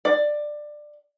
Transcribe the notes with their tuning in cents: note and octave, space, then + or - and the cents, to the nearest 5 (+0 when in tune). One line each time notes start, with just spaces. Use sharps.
D5 +15